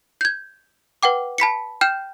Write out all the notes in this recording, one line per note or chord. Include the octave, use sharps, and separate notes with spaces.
G6 G#6
B4 F#5 G5 D6
A5 B5 B6 C#7
G5 F6 G6 E7